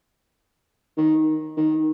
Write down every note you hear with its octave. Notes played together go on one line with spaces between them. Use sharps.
D#3
D#3